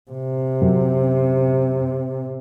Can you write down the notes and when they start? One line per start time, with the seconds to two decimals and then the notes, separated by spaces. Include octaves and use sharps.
0.12 C3
0.62 F#2